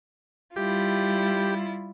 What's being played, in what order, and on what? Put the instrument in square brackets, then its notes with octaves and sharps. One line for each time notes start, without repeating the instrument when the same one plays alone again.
[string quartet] G3 E4 F4 [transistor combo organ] G4